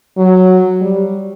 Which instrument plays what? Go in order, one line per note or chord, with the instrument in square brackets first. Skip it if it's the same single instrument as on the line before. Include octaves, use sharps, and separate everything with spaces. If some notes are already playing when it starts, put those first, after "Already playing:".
[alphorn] F#3
G3